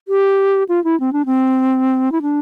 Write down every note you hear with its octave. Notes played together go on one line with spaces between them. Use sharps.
G4
F4
E4
C4
D4
C4
E4
D4